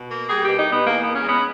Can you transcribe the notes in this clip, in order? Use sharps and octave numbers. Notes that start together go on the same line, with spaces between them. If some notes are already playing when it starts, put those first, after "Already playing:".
Already playing: B2
A#3
G3 G#4
B2 G4
D#4
B2 B3
E2 A#3
E2 B3
C#4
G#3 B3